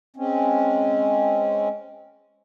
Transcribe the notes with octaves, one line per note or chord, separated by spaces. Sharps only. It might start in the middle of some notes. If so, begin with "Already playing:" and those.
G#3 C4 C#4